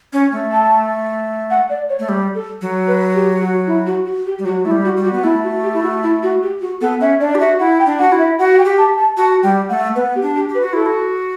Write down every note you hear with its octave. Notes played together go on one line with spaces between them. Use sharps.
C#4
A3
A5
F#5
D5
C#5
A3
G3
A4
F#3
B4
G4
F#4
E4
F#4
F#4
G4
G3
F#3 F#4
A3 E4
G3
F#4
G3
F#4
B3
A3 E4
F#4
G4
E4
F#4
E4
F#4
G4
F#4
B3 A4
C#4 E5
D4 D5
G4
F#4 E5
E4 F#5
G5
D4
F#4 F#5
E4
E5
F#4 F#5
F#5
G5
G4
A5
A5
F#4 A5
G3 G5
A3 F#5
B3 B4
G4
D4
G4
G4
B4
F#4
E4 A4
F#4